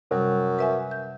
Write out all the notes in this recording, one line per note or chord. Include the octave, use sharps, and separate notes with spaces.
F#2 C3 G3
B4 E5 G#5
G6